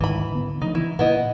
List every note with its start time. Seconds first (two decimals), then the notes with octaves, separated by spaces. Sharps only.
0.01 D2 G#2 D#3 E3 B5
0.32 D3 B3
0.62 C#3 F3 A3 D#4
0.75 E3 E4
0.99 A#2 B3 E4 D#5